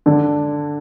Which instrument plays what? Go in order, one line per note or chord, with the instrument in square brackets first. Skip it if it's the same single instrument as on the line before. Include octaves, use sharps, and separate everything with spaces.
[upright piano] D3 [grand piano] D4